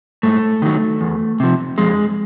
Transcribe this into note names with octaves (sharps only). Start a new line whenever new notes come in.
G#2 A3
D#3 F#3
E2
C3 F3
F2 G#3